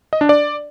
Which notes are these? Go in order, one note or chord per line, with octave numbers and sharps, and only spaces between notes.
D#5
D4
D5